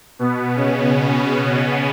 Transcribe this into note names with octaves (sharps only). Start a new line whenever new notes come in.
B2 B3
C#3 C#4
C#3 C#4